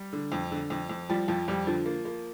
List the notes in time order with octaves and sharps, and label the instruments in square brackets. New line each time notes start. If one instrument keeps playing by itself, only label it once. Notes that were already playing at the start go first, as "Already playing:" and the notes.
Already playing: [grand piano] G3
[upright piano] D3
F2
D3
F2
F2
[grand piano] F3 [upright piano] G3
[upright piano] F2 [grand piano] F3
[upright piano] F2 [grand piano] G3
[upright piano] D3 [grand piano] F3
[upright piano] A#3
A#3